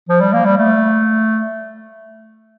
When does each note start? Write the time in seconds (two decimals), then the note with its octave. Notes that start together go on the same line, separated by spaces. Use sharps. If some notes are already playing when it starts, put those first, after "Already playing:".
0.09 F3
0.21 G3
0.33 A#3
0.45 G3
0.58 A3